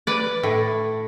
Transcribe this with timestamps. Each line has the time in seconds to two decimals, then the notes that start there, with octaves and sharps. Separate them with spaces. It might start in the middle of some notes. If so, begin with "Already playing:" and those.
0.07 B4 D5
0.43 A2